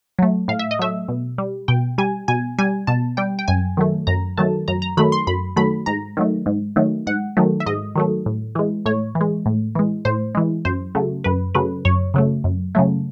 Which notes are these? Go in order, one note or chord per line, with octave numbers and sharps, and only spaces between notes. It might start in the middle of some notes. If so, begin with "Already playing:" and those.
F#3 A3
A2 F5
E5
D#5
F#3 A3 E5
B2
G3
B2 G5
G3 G#5
B2 G#5
G3 G#5
B2 A5
G3 G5
G5
F#2 G#5
D#3 F#3 A3
F#2 A#5
D#3 F#3 A3 A5
F#2 A#5
A#5
D#3 F#3 A3 B5
C6
F#2 B5
D#3 F#3 A3 B5
G#2 A#5
D#3 F#3 A3
G#2
D#3 F#3 A3
G#2 F#5
D#3 F#3 A3
E5
G#2 D#5
D#3 F#3 A3
A2
E3 G#3
A2 C#5
E3
G#3
A2
E3 G#3
A2 C5
E3 G#3
F#2 C5
C#3 F#3 A3
F#2 B4
C#3 F#3 A3 B4
F#2 C#5
C#3 F#3 A3
F#2
C#3 F#3 A3